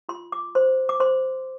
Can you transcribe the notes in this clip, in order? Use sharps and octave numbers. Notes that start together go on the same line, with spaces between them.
F4 C6
D6
C5 C6
D6
C5 C6